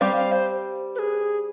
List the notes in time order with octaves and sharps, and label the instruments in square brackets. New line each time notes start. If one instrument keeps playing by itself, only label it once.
[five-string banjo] G3 C4 G4 [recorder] F5
[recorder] F5
C5
B4
G#4